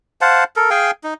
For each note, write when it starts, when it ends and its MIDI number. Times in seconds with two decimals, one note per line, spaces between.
0.21 0.44 72
0.21 0.44 77
0.21 0.44 78
0.21 0.44 81
0.56 0.70 69
0.56 0.70 70
0.70 0.91 68
0.70 0.91 77
0.70 0.91 79
0.70 0.91 80
1.04 1.14 63